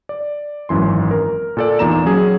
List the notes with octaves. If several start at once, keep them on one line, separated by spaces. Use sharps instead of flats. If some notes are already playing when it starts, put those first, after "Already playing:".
D5
G#1 F#2 E3 C6
A#4
A#2 A4 D5
E2 A#2 D#4 A#5 E7
F#3 C#4 G#4